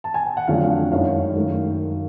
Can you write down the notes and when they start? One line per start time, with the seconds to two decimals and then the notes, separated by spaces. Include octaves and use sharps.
0.04 A5
0.14 G#5
0.25 G5
0.37 F#5
0.47 F2 D3 F#3 A3 D4 F5
0.64 F5
0.69 F#5
0.91 F#2 D#3 G#3 C#4 E4 F5
1.36 F#2 D#3 F#3 A3